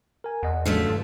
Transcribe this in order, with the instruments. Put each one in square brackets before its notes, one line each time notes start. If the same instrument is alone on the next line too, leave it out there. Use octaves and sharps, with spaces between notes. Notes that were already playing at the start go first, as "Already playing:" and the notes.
[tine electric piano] A#4 G#5
[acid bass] E2 [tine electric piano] D#5 F#5
[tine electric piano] C#3 D4 B6 [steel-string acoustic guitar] F3 F#3 A3
[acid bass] G2 [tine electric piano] D#3